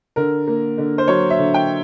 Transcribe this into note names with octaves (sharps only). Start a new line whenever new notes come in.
D3 A#4
A#3
D3
C5
F#3 C#5
E5
D3
G5